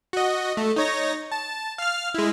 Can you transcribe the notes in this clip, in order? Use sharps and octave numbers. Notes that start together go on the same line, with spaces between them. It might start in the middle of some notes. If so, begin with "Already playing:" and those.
F#4 D#5
A3
D#4 C#5 A#6
A5
F5 F6
G#3 E4